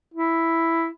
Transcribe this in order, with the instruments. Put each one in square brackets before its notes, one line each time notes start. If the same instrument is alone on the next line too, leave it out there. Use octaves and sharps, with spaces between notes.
[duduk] E4